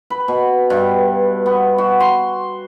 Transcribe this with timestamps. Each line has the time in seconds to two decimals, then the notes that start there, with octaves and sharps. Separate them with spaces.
0.10 B4
0.28 B2
0.70 G2
1.46 B3
1.78 F#4
2.00 C6